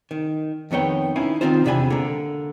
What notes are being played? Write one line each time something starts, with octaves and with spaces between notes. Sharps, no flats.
D#3
F2 D#3 B3 C#5 G5
C#4 D#4 E4 F5 G#5
D#3 F#3 C4 D#4 F4 C5
E2 C3 D4 E5 G#5 B5
D3 A#3